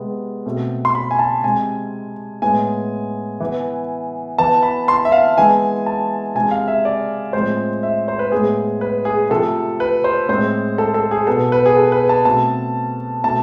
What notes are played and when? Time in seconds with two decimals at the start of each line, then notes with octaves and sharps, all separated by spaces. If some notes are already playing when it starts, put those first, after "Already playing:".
Already playing: C3 G#3 B3
0.46 B2 A3 C4
0.85 C6
0.95 B5
1.11 G#5
1.19 A5
1.43 C3 G#3 C4 G#5
2.42 A2 G#3 B3 G#5
3.40 E3 B3
4.38 E3 B3 A5
4.63 B5
4.88 C6
5.05 E5
5.12 F5
5.38 E3 G#3 B3 G#5
5.86 A5
6.35 C3 G#3 C4 G#5
6.51 F5
6.68 E5
6.85 D5
7.33 A2 F3 G#3 C4 C5
7.83 E5
8.08 C5
8.19 B4
8.32 A2 G#3 B3 G#4
8.81 B4
9.05 G#4
9.30 C3 F3 A3 A4
9.80 B4
10.04 C5
10.29 A2 G#3 C4 C5
10.78 A4
10.94 A4
11.11 G#4
11.27 B2 B3 A4
11.52 B4
11.66 G#4
11.77 A4
11.92 B4
12.09 A5
12.25 B2 A3 C4 A5
13.24 B2 A3 C4 A5